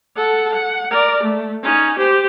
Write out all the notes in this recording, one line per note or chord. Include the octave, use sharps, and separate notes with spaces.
A4 F#5
F#5
A#4 D5
A3
C#4 D#4
G4 C5